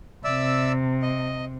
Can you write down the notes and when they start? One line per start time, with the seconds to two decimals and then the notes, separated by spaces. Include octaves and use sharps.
0.24 C3 D5 E5 E6
1.02 D#5